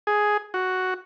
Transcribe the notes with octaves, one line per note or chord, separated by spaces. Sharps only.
G#4
F#4